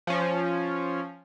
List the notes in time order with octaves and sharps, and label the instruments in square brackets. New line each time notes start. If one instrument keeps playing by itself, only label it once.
[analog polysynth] F3 C#4